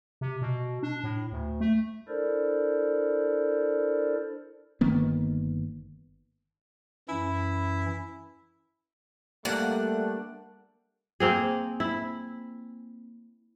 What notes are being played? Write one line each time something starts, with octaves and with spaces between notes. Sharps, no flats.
C3
B2
D4
A2
D2
A3
D4 E4 A4 A#4 C5 D5
G1 D#3 A#3 B3
F#2 E3 C#4 E4
G3 A3 A#3 D4 F#5
A#3 C4 G#4
E4